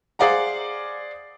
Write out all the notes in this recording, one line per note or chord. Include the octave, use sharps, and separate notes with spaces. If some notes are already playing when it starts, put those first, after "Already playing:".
G#4 C5 D5 F5 F#5 A#5